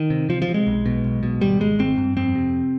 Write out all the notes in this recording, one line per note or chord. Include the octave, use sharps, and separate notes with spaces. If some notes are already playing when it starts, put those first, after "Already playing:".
Already playing: D#3
C3
C3 F3
F3
C3
G#3
B1
B2
B1
B2
G#1 G3
G#1 G#3
G#1 C4
G2
F2 C4
C3